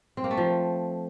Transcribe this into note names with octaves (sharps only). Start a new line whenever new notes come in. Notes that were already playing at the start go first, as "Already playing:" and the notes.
C4
A#3
A3
F3